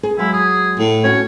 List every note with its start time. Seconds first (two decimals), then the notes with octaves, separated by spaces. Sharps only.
0.03 G#4
0.18 F#3 G#3 E4 F5
0.33 G#4
0.79 A2
1.04 C#4 F#4 C#5